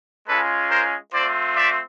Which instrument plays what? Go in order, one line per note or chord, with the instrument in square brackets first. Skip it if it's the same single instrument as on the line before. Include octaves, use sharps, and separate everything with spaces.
[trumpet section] G#3 C#4 F4 A4 B4
A#4 C5
A3 C4 F4 C5 D5
D5 E5